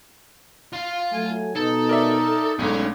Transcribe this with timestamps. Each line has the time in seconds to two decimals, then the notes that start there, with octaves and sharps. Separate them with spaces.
0.73 F4 F5
1.12 F#3 A3 G#5
1.56 B2 D#4 A4
1.89 A#4 D5 E5
2.59 B1 G#2 A3 C#4 D4 C#5